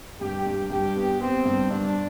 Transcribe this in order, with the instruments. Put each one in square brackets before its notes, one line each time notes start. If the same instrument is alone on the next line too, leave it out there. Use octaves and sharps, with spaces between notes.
[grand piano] G2 [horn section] G4
[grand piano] G2
[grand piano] G2 [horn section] G4
[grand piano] B3
[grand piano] B3 [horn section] C4
[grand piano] G2
[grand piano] G2 [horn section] D4